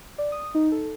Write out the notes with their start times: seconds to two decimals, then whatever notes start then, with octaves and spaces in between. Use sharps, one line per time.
0.18 D5
0.32 D#6
0.55 D#4
0.72 A4